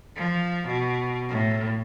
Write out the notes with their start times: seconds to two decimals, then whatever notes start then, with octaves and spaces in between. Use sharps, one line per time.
0.16 F3
0.67 B2
1.29 A2